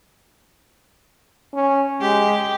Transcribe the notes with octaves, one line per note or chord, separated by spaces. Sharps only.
C#4
G#3 G4